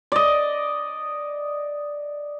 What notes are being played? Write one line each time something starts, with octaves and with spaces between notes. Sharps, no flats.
D5 D#5